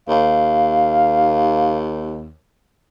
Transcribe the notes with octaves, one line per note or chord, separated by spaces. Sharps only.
D#2 F5